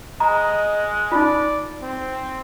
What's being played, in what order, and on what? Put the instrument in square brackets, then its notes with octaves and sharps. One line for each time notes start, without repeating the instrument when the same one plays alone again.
[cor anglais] G#3 [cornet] D#5 [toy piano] A#5
[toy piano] D#4 F4 [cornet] D5
[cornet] C4